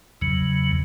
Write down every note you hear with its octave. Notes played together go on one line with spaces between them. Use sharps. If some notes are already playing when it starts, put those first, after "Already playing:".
E2 C#3 F#3